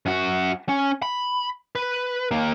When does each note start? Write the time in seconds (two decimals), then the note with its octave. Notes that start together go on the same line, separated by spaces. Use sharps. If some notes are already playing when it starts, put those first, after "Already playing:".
0.06 F#2 F#4
0.69 C#4
1.02 B5
1.75 B4
2.31 D#2 A#3